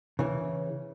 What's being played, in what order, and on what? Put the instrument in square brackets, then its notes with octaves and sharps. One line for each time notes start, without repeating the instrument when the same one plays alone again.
[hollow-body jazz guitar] C#3 E3